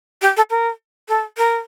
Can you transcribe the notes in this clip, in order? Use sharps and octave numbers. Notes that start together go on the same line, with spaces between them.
G4
A4
A#4
A4
A#4